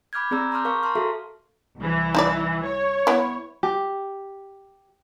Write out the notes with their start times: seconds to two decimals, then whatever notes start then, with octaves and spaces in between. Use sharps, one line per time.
0.13 B5 D6 F6 G6 G#6
0.31 C4 G#4 D5 A#5 E6
0.51 A5 A#5 C6 D6 F6 G6
0.65 A#4 F5 C#6 F6
0.83 A5 A#5 C6 F6
0.95 F#4 G#4 A4 E5 F5
1.78 C2 E3
2.15 D#4 E4 D5
2.63 C#5
3.07 B3 E4
3.63 G4